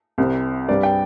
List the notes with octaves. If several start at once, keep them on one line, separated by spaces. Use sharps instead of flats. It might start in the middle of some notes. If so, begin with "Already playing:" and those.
C2 C3 G3 C4
G2 G3 C4 D5
G5